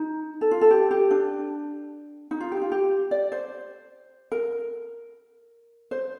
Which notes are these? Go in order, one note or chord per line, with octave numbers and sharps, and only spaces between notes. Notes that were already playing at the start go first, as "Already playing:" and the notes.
Already playing: D#4
A4
F4
A4
G4
G4
D4
D#4
F4
D#4 G4
F4
G4
D5
C5
A#4
C5